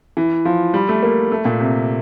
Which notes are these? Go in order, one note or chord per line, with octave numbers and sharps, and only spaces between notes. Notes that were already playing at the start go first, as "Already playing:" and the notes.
E3
F3
G3
A3
A#3
A3
A#2
C3